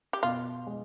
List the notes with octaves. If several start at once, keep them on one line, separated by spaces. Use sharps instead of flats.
G4
B2 F4
G#3